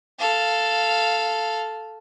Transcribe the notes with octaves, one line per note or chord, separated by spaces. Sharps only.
A4 F5